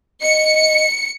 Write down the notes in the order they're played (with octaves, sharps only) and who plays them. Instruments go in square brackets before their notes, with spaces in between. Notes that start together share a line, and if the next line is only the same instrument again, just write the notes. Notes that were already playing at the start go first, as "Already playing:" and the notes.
[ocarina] D#5 [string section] C#7